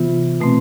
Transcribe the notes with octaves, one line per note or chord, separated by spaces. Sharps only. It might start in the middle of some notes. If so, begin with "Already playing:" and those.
Already playing: C3 E3 B3 F4
B2 A3 C4